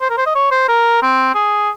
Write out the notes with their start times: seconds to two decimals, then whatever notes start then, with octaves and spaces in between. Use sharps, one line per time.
0.01 C5
0.10 A#4
0.18 C5
0.26 D#5
0.35 C#5
0.51 C5
0.68 A#4
1.02 C4
1.35 G#4